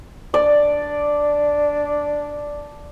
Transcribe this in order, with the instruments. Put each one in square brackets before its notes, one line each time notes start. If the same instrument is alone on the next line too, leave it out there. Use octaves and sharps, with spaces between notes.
[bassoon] D4 [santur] D5